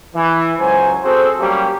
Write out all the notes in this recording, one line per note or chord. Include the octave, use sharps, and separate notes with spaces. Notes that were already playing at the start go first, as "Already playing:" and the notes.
E3
C#2 F#3 C5 G#5
C4 F#4 G#4 A4 C5
F#3 G3 A#3 C#4 G4